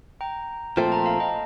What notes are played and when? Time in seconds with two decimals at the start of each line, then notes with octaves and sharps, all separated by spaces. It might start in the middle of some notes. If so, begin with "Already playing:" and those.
0.21 G5 A#5
0.77 A#2 F3 A3 C4 A5 C6
0.92 G5 A#5
1.06 F5 A5
1.20 D#5 G5